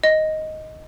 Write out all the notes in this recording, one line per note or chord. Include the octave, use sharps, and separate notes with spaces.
D#5